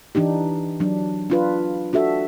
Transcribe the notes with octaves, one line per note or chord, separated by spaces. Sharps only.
E3 D4 D#4 G4
F#3 D4
D4 F4 B4
D4 F#4 A4 E5